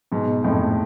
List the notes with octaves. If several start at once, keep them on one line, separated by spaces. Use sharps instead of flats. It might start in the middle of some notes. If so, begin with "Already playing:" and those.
G#2 B2
F2 A2